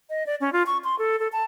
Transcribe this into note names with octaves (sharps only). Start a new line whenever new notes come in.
D#5
D5
C#4
F4
C#6
C6
A4
A4
A5